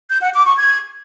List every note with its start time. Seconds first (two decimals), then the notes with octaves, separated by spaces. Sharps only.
0.09 G6
0.21 F#5
0.33 D6
0.45 C#6
0.57 G#6